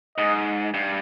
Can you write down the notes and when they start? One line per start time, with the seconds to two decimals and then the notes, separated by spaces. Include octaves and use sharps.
0.17 G#2 D#5
0.74 G2